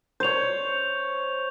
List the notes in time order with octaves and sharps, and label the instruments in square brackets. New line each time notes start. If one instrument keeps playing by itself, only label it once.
[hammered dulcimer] C5 C#5 [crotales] G6 F7